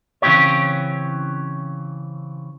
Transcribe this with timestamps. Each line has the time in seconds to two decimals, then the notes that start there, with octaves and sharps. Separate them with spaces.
0.22 C#3 E3 C4 C#4 G4 C#5